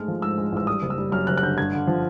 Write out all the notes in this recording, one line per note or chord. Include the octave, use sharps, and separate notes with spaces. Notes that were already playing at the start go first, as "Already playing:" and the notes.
Already playing: G#2 G#3 A3 F6
F3
G#2 E6
G#3
A1 E6
G3 D#6
F#1
E6
G3
F#2 F6
F#1 F#6
F#6
D3 G6
G2 G#6
D3
F3